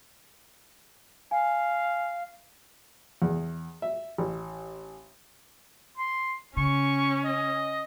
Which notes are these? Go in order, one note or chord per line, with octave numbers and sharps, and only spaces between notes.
F5 G#5
E2
E5
A1
C6
C#3 C#4 C#6
D#5